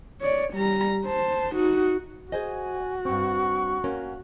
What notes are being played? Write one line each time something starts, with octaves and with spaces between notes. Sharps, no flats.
C#5 D5
G3 A#5
C5 A5
D#4 F#4
F#4 G#4 C5 D#5 G#5
G2 C4 C#6
A#3 C#4 A#4